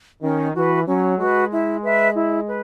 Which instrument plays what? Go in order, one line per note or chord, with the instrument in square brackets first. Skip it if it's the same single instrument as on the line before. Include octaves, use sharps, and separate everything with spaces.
[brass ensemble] D#3 [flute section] C#4
[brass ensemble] E3 [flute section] F#4 B4
[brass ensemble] F#3 [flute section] C#4
[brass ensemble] G#3 [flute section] F#4 B4
[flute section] E4
B4 E5
E4
B4